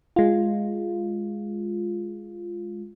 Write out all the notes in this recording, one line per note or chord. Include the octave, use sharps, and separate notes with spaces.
G#3 F4